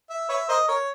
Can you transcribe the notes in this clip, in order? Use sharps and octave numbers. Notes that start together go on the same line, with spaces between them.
E5
B4 C#5 E5
A#4 C5 D#5
A#4 C#5